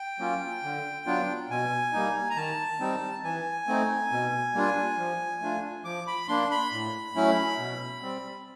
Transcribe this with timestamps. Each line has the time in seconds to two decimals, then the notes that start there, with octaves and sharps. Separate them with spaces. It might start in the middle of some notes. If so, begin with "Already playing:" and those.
Already playing: G5
0.19 F#3 A#3 C#4 F4
0.63 D3
1.06 F#3 B3 D4 F4
1.50 B2 G#5
1.93 G3 A#3 D#4
2.30 A#5
2.37 D#3 A5
2.80 G3 C4 D#4
3.24 E3 G#5
3.67 A3 C4 D#4
4.12 B2
4.54 G3 A#3 D4 F4
4.98 F3
5.41 A3 D4 F4
5.85 F3 D6
6.07 B5
6.28 A#3 D4 C6
6.51 B5
6.72 A2
7.16 F#3 A3 C#4 E4
7.59 B2
8.02 G3 C4